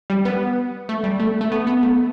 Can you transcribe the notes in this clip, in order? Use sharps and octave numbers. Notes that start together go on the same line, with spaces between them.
G3
B3
A3
G3
A3
A3
B3
B3
A3